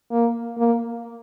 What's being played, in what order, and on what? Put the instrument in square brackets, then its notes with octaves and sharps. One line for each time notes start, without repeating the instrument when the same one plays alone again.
[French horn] A#3
A#3